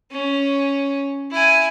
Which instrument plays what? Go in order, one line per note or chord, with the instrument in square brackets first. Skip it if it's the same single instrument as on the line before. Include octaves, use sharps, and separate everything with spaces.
[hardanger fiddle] C#4
E4 G#5